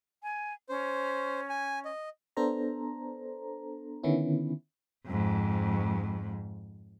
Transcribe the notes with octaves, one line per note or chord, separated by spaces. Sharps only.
G#5
C#4 C5
G#5
D#5
B3 D4 A4 C5 A#5
D3 D#3 B3 C#4 E4
F2 G#2